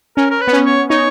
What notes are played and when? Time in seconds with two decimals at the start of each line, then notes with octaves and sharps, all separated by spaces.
0.17 C#4 A#4
0.30 A#4
0.41 B4
0.47 B3
0.53 C#4
0.66 C#5
0.90 D#4 C#5